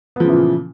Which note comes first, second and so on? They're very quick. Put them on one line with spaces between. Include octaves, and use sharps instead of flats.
B3 F3 C#3 E3 A#2